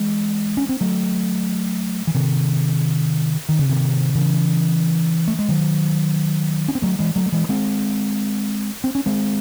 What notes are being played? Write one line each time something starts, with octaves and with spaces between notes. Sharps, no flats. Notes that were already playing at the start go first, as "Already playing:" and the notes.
Already playing: E3 G#3
C#4
C4
F#3 A3
E3
C3 D#3
D#3
C#3
C3 D#3
C#3 E3
A3
G#3
D#3 F#3
C#4
C4
F#3 A3
E3 G#3
F#3 A3
A3
E3 G#3
G#3 C4
C4
C#4
G#3 C4